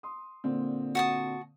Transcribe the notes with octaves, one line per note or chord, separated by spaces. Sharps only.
C6 D#6
A#2 D3 C4
F#4 A5 D#6